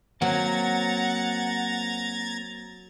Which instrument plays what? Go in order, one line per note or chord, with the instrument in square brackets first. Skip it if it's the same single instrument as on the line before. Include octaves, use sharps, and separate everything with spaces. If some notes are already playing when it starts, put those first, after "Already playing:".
[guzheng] F#3 [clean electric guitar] A#3 C4 [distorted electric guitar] F#5 [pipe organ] A#5 G#6 A6